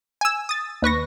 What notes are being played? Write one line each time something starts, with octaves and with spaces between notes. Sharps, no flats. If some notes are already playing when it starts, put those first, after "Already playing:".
G#5 E6
D#6 A6
D#2 B4 C#6 A#6